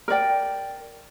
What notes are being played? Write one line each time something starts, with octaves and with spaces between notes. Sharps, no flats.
A#4 D5 G5